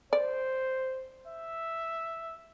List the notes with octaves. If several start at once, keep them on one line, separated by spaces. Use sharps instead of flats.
C5 D5
E5